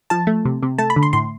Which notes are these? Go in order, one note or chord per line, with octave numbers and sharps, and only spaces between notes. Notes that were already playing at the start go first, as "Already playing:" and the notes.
F3 A5
A3
C3
C3
A3 A5
B5
D3
C6
A2 C6